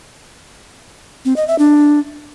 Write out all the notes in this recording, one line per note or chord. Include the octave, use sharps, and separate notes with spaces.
C4
D#5
E5
D4